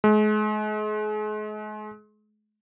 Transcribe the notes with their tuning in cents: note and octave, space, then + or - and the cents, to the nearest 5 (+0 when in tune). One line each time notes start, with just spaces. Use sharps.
G#3 +40